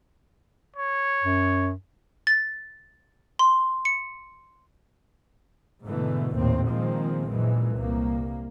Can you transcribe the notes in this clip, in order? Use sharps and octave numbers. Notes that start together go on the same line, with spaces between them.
C#5
F#2
A6
C6
C#7
G#2 B2 D3 E3 A3
A#1 D#2 A2 C3 C4
A#2 D#3 F3 G#3 A#3 C4
A#1 F#2 A#2 E3 G#3
C2 A#3